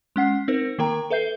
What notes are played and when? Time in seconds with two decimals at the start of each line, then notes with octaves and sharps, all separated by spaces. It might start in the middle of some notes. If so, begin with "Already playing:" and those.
0.16 G#3 C#4 F#5 C7
0.48 C4 D#4 A#4 C5
0.79 D#3 A#3 A#4 G5 A#5
1.10 A4 B4 E5 G6 C7 G7